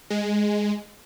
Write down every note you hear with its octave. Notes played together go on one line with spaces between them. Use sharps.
G#3